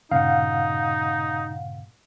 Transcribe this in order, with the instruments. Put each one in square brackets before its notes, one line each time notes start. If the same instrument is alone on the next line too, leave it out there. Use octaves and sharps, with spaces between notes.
[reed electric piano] G2 A#2 C#3 [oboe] D#4 [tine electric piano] F5 F#5